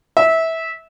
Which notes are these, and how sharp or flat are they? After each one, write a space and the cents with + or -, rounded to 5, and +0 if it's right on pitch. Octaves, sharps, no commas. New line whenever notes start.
E5 -20